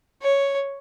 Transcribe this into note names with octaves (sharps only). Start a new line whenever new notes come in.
C#5